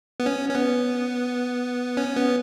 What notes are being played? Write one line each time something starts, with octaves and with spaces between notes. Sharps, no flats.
B3
C#4
C#4
B3
C#4
B3